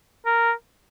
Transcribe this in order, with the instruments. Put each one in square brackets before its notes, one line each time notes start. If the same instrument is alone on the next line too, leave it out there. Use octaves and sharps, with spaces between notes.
[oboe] A#4